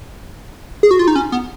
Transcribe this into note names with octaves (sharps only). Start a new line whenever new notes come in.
G#4
F#4
F4
D#4
C#4
B3